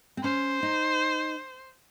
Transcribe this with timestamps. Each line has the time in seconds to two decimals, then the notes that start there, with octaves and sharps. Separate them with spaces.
0.17 C4
0.23 C#4 C5
0.63 D#4